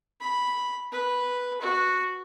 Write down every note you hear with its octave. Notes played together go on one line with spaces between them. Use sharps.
B5
B4
F#4